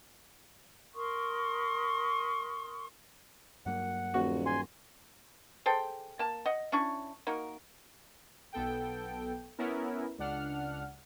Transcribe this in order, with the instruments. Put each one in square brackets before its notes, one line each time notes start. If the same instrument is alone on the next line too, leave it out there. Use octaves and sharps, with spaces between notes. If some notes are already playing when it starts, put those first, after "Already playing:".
[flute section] A#4 C6 C#6 D#6
[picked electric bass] G2 F#3 A#3 [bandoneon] F#5
[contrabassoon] D#1 [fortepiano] F#4
[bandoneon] G#5 C6
[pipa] G#4 A4 C5 G5
A#3 A5
D#5 F#5
C#4 D4 E4 C#6
A#3 D#4 F#4 A#4
[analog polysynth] B1 B3 A4 G5
B3 C#4 E4 A#4
C#2 D4 F#5 F6